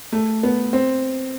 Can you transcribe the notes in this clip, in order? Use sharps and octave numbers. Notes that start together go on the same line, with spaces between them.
A3
B3
C4